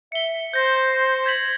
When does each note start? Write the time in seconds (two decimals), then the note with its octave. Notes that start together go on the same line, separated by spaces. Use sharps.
0.12 E5 C#7 G7
0.53 C5 G6 A#6
1.26 G#6 B6 F#7